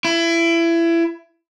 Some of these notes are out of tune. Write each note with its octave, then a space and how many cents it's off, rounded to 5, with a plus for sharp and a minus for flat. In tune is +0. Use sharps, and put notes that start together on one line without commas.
E4 +25